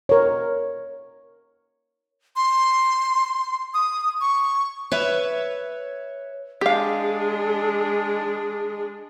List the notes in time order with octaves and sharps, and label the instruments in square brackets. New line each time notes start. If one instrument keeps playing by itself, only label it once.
[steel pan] A#4 C#5
[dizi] C6
D#6
C#6
[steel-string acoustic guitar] B4 C#5 E5
[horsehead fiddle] G#3 D4 [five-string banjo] G4 F5 [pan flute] G#4